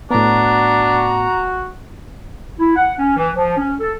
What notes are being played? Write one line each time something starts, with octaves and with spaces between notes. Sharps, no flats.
A2 B3 D4 F#4 A#5
E4
F#5
C#4
E3
F3
C#4
A4